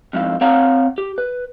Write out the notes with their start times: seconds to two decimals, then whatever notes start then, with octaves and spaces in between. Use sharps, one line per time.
0.13 F2 G#2 F3 E4 F4
0.41 C4 C#5 F5 F#5 A#5
0.98 G4
1.18 B4